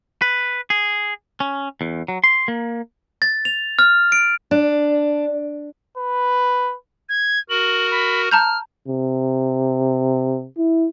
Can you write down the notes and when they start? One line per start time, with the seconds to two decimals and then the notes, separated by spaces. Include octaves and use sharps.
0.22 B4
0.70 G#4
1.40 C#4
1.81 E2
2.08 F#3
2.24 C6
2.48 A#3
3.22 A6
3.45 F7
3.79 F6
4.12 D7
4.51 D4
5.97 B4
7.09 G#6
7.50 F#4 A#4 F#7
7.91 B5
8.31 A5 A#5 F6 G6
8.88 C3
10.58 E4